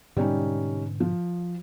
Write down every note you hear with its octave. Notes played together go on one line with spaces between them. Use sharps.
G#2 B2 D3 G3 C#4 D#4
F3